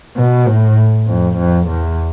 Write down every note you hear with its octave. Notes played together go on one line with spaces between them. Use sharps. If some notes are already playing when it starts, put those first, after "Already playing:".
B2
A2
F2
F2
E2